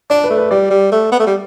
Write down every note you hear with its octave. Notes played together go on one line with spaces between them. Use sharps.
D4 D5
B4
A3
B4
G3 D5
G3
A3
B3
A3
G3